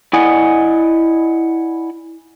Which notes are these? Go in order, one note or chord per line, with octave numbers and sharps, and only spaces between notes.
E4 D5 D#5 F#5 G#5